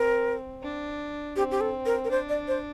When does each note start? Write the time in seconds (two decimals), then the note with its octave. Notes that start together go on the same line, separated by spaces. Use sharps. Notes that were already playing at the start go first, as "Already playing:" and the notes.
Already playing: C4 A#4
0.63 D4
1.36 C4 G4
1.51 G4
1.61 A4
1.86 A#4
2.04 A#4
2.11 D4 C5
2.29 D5
2.48 C5